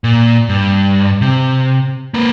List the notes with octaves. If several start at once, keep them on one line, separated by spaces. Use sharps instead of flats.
A#2
G2
C3
A#3 B4